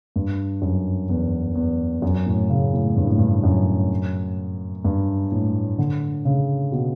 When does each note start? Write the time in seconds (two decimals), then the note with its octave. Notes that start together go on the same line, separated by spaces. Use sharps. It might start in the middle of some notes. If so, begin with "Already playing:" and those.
0.16 G2
0.62 F#2
1.09 E2
1.55 E2
2.02 F#2
2.26 A2
2.50 C#3
2.73 A2
2.97 G2
3.07 A2
3.18 G2
3.44 F#2
4.85 G2
5.32 A2
5.78 D3
6.25 C#3
6.72 B2